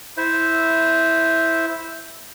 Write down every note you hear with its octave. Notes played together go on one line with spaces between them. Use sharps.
E4 C5 E5